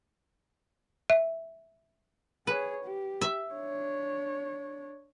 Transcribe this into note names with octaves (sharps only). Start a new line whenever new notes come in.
E5
G#4 B4 C#5
G4
E5
D4 C#5